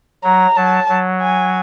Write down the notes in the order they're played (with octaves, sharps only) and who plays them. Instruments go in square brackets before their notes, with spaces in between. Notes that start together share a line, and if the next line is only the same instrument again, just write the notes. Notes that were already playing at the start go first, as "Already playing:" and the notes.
[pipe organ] F#3 [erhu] A#5
[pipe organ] F#3 [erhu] A5
[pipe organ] F#3
[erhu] G#5